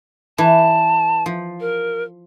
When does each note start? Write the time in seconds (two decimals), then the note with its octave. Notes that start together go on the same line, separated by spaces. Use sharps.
0.38 E3 A5
1.26 F3
1.61 A#4